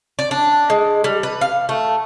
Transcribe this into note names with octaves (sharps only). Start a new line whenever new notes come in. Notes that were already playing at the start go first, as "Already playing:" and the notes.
D5
D4
G#3
G3
B4
F5
A3